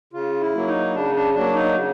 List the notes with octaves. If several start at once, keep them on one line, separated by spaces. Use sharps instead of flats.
C#3 F4
E4
F#3 A#3
D#4
C#3 D4
D4
F#3 A#3 D4
D#4
C#3